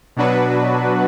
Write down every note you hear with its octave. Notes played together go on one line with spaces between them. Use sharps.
B2 F#3 D4 F#4 B4